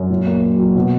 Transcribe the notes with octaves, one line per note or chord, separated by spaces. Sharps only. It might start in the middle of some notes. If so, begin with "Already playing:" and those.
Already playing: F#2
A#2
A#3
F#3
F#3
B2